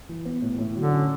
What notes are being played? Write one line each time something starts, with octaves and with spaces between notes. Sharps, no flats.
E3
B3
A2
A2
D3 F#3
C#4